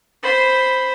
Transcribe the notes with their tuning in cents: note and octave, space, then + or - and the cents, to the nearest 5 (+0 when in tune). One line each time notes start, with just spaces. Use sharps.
C5 -5 B5 +0